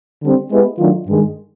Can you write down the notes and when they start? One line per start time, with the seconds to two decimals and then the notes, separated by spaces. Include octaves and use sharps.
0.21 D3 G3 C4
0.50 G#3 B3 E4 G4 B4
0.78 D#3 F#3 A3 D4 F4
1.06 G2 D#3 G#3